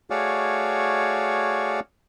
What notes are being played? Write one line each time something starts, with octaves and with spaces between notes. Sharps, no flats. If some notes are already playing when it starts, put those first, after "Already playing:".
A3 F#4 G#4 C#5 D5 F5